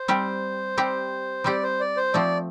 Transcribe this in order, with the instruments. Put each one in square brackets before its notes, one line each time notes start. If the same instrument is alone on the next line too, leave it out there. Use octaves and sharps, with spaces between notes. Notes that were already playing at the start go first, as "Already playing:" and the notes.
Already playing: [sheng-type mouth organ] C5
[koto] G3 C4 G4
G3 C4 G4
[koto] G3 C4 G4 [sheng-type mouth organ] D5
[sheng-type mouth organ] C5
D5
C5
[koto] F3 A3 C4 [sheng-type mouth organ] D5